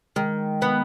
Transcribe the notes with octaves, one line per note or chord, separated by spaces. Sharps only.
D#3 G#3
B3